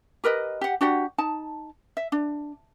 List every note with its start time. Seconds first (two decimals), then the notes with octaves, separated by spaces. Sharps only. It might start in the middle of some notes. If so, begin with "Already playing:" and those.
0.24 G4 A#4 B4 D#5
0.61 G4 F#5
0.81 D4 F#4 G4 F#5
1.18 D#4 A5
1.97 E5
2.12 D4